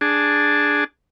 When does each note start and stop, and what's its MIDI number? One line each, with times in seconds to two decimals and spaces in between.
0.01 0.84 62
0.01 0.84 68
0.01 0.84 81